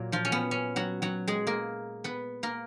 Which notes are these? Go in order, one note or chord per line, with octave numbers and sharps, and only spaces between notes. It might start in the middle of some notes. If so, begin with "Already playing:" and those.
Already playing: A#2 F#3 A#3
F3 F4
C#4
B3
C#4
F#3 F#4
F#3 F#4
G#3 G#4
A#3 A#4
B3 B4
A#3 A#4